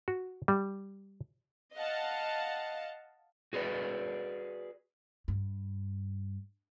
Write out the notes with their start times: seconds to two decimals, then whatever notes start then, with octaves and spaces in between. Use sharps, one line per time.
0.08 F#4
0.48 G3
1.76 D#5 F5 F#5 A5
3.53 F#4 G#4 B4 D5
5.28 G2